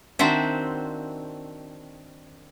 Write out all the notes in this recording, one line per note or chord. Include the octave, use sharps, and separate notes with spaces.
D#3 C4 D4 F#4 C5 E5